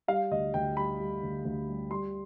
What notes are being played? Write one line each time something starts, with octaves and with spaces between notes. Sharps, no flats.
G3 F5
D2 D#5
D2 G5
G3 B5
G3
D2
D2
G3
G3 C6